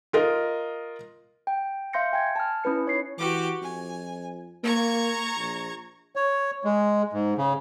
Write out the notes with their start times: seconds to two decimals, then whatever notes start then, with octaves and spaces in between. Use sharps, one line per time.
0.13 F4 A#4 D#5
1.47 G5
1.93 E5 F5 C6 G6 A#6 C#7
2.13 G5 G#5 G#6
2.36 A5 F6
2.64 C#4 E4 B4 C#7
2.85 D#4 C#5 C7
3.18 E3 F#4 G4 D6
3.62 F2 G#5
4.63 A#3 A#5 C#6 G#6
5.37 A#1
6.16 C#5
6.64 G#3
7.13 G#2
7.38 C#3